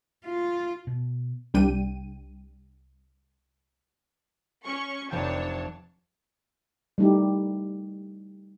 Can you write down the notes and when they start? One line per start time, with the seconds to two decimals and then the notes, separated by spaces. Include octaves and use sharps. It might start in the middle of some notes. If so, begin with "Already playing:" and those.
0.25 F4
0.87 B2
1.54 C2 G3 D4 G5 D#7
4.64 C#4 C#6
5.11 F1 F3 D4 C#5 G5 A5
6.98 G3 A3 D#4 E4 G4